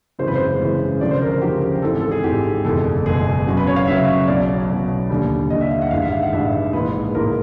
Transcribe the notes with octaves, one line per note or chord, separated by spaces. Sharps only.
G#1 F#2 C#3 E3 G#3 C5
B4
C5
G#1 F#2 C#3 E3 G#3
D2 C#3 F3 D5
C5
A#4
A#4
D2 C#3 F3 G4
G#1 G#2 E3 A4
A4
G#4
G#1 G#2 E3 G4
F#1 E2 B2 G#3 A4
F#1 E2 B2 G#3 G#4
F#2 C#3 F#3
B4
C#5
F5
F#2 C#3 F#3 E5
B1 B2 F#3 D5
B1 B2 F#3
D#2 D3 G3
D#2 D3 G3 D#5
E5
F5
F#5
A1 G2 D#3 G#3 F5
E5
F5
F#5
A1 G2 D#3 G#3 E5
A#1 G#2 E3 G#3 B4
A#1 G#2 E3 G#3 A#4